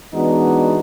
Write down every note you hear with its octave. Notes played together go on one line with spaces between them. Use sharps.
E3 G#3 B3 D4 D#4 F#4